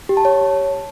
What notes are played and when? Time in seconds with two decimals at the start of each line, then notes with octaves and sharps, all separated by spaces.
0.09 G4
0.17 A5
0.25 C#5